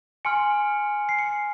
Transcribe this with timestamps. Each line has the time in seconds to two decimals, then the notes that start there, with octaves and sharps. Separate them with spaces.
0.25 G#5 C6 F6 C#7
1.09 C7
1.19 C#7